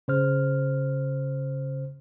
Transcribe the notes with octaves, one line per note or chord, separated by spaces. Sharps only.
C#3 C5 F6